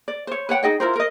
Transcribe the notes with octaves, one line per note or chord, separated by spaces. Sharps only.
D5
C5 C#5
B4 C#5 F#5 G5
D#4 G#4 D#5 G5
E4 F4 A#4 C5
A#4 D#5